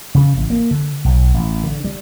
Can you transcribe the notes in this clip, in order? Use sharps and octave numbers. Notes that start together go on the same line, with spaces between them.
C#3
A1
A#3
D3
B1
A1
D3
G3